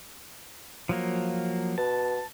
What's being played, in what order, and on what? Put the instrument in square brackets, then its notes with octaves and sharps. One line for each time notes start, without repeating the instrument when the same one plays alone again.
[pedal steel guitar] F3 F#3 A#3
[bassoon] B2 [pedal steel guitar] A5